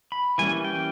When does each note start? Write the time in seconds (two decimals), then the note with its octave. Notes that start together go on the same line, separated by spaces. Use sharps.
0.12 B5
0.38 E3 G3 A#3 C#4 G#5
0.64 G5